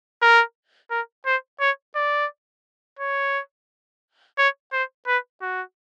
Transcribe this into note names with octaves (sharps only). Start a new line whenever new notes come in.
A#4
A#4
C5
C#5
D5
C#5
C#5
C5
B4
F#4